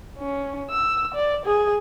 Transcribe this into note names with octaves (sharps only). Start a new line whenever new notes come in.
C#4
E6
D5
G#4